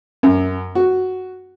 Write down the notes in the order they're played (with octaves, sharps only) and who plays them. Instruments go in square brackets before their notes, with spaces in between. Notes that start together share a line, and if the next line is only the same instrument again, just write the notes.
[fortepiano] F#2
F#4